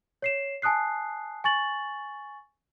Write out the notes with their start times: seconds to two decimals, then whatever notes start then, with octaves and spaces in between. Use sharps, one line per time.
0.22 C#5 C7 E7
0.62 G#5 A5 D#6 F#6 C7
1.44 G#5 C#6 A6 F#7